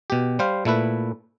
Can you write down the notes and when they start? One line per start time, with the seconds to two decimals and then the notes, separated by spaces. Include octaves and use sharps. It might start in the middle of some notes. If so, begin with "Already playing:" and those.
0.10 B2 G4
0.39 G3 C5 F5
0.65 A#2 A3 E4 B4